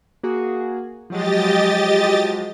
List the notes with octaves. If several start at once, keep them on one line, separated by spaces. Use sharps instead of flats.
A#3 F#4 G#4
F3 F#3 G#3 G4 D#5 A6